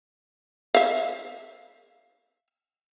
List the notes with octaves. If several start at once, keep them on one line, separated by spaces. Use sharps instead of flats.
E5 F5